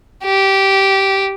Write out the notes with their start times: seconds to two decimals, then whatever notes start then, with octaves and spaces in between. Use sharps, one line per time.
0.24 G4